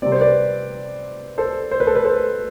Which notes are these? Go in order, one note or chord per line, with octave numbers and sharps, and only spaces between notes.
C3 G3 C4 D5
C5
B4 D5
A4 C5
C5
B4
A4
B4
A4 C5